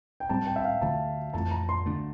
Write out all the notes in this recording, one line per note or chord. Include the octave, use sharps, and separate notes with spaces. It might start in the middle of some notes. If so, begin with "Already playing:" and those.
G5
A2 G3 C4 A5
G5
E5
F5
D2 D3 F3 A3 A5
F2 E3 A3 A5
A#5
C6
D2 D3 A3 D4